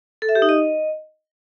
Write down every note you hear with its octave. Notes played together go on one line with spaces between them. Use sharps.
A4
E5
G4
D#4
D#5